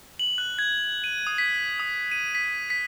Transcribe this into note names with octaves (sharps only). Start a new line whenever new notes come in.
F#7
F#6
G#6
D#7
D#6
B6
D#6
D#7
B6
B6